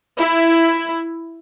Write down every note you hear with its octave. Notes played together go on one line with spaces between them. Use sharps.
E4